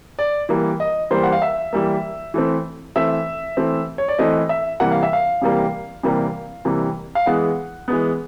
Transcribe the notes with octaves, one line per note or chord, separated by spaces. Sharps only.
D5
E3 G3 A#3
D#5
E3 G3 A#3 C5
F#5
F5
E5
E3 G3 A#3
E3 A3 C4
E3 A3 C4 E5
E3 A3 C4
C#5
D5
E3 A3 C4 D#5
E5
C3 E3 G3 A#3 F#5
F5
E5
F5
C3 E3 G3 A#3
C3 E3 G3 A#3
C3 E3 G3 A#3
F5
E3 G#3 B3 F#5
E3 G#3 B3